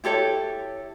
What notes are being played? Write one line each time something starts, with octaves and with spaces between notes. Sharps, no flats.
E4 G4 A4 C#5